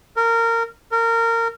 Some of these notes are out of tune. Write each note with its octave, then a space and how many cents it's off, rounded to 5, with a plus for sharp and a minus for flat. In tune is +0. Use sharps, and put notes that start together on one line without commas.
A#4 -20
A#4 -25